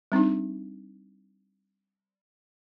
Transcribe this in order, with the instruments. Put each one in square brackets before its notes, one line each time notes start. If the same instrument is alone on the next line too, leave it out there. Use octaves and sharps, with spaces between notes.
[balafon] G3 C4 D4 D#4